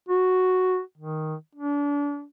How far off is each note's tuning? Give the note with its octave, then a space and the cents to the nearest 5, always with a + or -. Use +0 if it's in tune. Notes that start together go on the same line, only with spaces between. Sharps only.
F#4 +0
D#3 +5
D4 -30